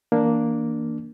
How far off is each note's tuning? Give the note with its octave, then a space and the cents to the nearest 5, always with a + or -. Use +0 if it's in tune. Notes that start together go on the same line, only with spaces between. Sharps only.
E3 -30 A#3 +0 D4 +0